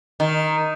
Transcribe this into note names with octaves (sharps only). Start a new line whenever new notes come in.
D#3